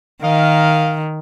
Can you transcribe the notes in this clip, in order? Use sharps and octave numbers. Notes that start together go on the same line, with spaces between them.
D#3 A#4 D#5 F5